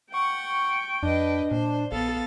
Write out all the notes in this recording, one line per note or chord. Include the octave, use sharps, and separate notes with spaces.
F#5 G5 C#6
F2 D4 B4 D#5
A#2 C5
A#1 B3 A4 F5 A6